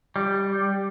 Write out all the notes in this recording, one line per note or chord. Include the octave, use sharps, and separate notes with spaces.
G3